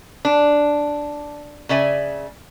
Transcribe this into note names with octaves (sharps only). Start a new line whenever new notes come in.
D4
C#3 D5 E5 G#5